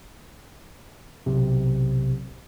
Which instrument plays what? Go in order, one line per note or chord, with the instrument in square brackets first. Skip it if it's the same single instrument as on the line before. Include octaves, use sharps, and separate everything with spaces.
[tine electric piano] B1 C3